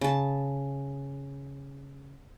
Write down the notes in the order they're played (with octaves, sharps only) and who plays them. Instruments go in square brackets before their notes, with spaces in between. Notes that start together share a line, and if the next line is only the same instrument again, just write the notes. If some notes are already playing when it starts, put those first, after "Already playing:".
[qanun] C#3 A5